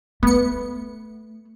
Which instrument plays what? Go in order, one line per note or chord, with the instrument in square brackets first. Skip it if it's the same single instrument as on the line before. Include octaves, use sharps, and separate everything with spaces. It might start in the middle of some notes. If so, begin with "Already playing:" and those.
[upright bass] A3 [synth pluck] B3 C#7